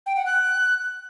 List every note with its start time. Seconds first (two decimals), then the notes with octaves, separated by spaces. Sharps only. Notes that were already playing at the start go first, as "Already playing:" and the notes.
0.06 G5
0.16 F#5
0.26 F#6